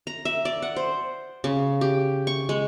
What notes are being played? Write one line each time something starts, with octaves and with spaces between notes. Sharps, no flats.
A#5
E5
D5
F#5
C5
C#3
G4
C#6
G#3